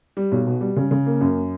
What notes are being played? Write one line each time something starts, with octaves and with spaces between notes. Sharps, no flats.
G3
B1
B2
G3
C#3
C#3
A#3
F#2